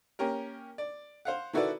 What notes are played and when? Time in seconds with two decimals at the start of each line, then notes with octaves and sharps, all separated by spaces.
0.19 A#3 C#4 G4 A#4
0.78 D5
1.25 C5 F5 F#5
1.53 D#3 E4 F#4 A4 B4 D5